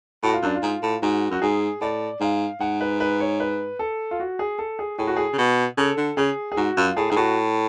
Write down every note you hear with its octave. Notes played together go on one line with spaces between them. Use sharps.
A2 F#4
F4
F#2 D4
F4
G#2
A2
G#2 F#4
F#2 F#4
G#2 G#4
A2 D5
G#2 F5
G#2 F#5
B4
B4
C#5
B4
A4
F4
F#4
G#4
A4
G#4
A2 G#4
F#4
G#4
C#3
B2
C#3 A4
D3
C#3 G#4
G#4
G#2 F#4
F#2 F4
A2 G#4
G#2 G#4
A2 F#4